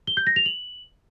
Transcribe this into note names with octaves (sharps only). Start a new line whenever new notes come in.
G7
G6
A#6
F7
F#7